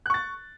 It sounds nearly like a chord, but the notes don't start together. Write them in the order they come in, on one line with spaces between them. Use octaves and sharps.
F#6 C#6 A6